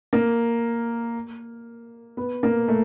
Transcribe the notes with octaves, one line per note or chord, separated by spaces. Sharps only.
A#3
B3
A#3
A3